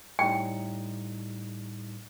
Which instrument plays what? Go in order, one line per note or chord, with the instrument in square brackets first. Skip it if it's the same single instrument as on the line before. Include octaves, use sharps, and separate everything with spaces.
[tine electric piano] A2 G3 D#4 [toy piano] G5